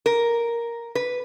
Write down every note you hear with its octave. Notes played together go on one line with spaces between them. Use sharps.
A#4
B4